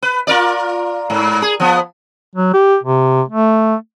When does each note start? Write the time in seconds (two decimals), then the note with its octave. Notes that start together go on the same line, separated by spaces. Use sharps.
0.02 B4
0.27 F4 A#4 D5
1.10 G#2
1.42 G#4
1.60 F3 B3
2.35 F#3
2.54 G4
2.83 C3
3.28 A3